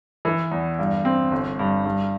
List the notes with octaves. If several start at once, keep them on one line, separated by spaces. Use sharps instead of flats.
E3
E2
G2
C4
G1
G2
G2